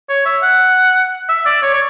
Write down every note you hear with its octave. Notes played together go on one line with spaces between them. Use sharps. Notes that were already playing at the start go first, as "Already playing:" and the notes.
C#5
E5
F#5
E5
D5
C#5
C#5